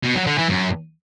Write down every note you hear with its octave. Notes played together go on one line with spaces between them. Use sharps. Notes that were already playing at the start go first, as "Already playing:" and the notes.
B2
F#3
D3
E3
F#2